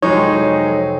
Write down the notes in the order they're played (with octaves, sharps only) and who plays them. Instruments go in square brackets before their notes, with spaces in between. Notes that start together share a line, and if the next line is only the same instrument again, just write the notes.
[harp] F2 C3 F3 [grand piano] F#3 G#3 D#4 [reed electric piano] C#5